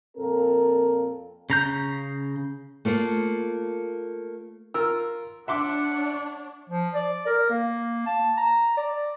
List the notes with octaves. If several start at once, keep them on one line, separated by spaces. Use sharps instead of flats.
F2 A#2 C4 A4 A#4
C#3 A#5 G6
A3 A#3 F4 C5
F4 A#4 E6
D4 C#5 E5 F#5 C6 D6
F3
D5
A#4
A#3
A5
A#5
D5